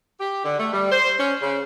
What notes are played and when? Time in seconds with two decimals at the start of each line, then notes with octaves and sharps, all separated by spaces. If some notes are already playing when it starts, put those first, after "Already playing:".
0.20 G4
0.44 D3
0.59 A3
0.73 G3
0.92 C5
1.19 C#4
1.42 C#3